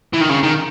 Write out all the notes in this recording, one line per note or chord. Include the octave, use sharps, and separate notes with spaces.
E3
D#3
C#3
D#3